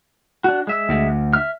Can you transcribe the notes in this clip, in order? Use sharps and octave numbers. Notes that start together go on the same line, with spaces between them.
D4 F#4
G#3 E5 E6
D2
E5 F6